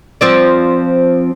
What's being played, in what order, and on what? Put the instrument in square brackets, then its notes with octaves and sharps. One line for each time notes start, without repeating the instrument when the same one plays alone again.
[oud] F3 C4 D5